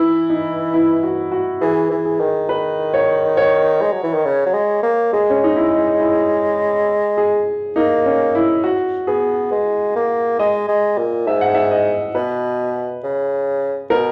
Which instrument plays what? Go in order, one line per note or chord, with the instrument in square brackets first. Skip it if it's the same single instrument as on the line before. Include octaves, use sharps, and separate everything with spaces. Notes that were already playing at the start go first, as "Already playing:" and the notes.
Already playing: [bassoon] E3 [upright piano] E4
[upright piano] D#4
E4
F#4
F#4
[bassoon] E3 [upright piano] G#4
[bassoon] E3
[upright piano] G#4
[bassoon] D#3
[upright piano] B4
C#5
C#5
[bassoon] G#3
F#3
E3
D#3
C#3
F#3
G#3
A#3
[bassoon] G#3 [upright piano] G#4
[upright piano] C#4
D#4
E4
E4
G#4
[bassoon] A#3 [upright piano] D#4
[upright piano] C#4
E4
F#4
[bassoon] B3 [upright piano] G#4
[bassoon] G#3
A#3
[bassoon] G#3 [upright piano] D#5
[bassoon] G#3
A#2
[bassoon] G#2 [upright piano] E5
[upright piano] F#5
E5
D#5
[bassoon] B2 [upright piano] B4
[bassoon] C#3
[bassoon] B2 [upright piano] A#4